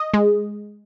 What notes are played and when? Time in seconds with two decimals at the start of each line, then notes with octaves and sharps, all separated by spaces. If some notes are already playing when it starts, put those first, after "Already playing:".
Already playing: D#5
0.14 G#3